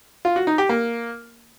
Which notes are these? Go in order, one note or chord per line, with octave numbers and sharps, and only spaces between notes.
F4
F#4
D#4
G4
A#3